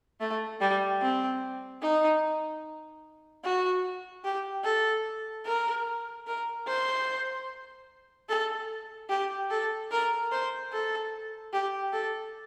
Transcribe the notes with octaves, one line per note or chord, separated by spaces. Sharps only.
A3
G3
C4
D#4
F#4
G4
A4
A#4
A#4
C5
A4
G4
A4
A#4
C5
A4
G4
A4